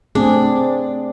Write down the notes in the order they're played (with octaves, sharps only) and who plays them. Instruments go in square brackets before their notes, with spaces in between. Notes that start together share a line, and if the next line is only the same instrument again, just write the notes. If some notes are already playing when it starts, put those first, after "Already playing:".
[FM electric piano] A3 [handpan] C4 G#4 [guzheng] D4